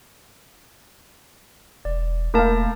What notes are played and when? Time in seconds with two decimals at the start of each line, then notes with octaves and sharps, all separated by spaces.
1.85 E1 D5
2.34 E1 A3 A#3 A#4 F5 A5